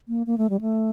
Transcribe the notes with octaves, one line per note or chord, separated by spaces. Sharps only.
A#3
A#3
A3
G3
A3